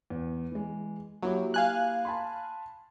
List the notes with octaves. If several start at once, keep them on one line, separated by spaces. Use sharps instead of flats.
E2
E3 G#3
F#3 A#3 E4 G4
F5 G#5 F#6
A5 B5 C6